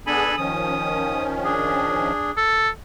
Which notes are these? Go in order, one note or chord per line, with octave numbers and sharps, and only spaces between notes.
B3 D4 G#4 A4 G#5 B5
D#3 F3 C#4 D#6
D4 G#4
A4